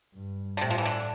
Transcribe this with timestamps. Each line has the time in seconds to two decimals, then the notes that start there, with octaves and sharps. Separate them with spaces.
0.14 G2
0.57 D3
0.61 A2 C3
0.70 F3
0.78 E3
0.85 D3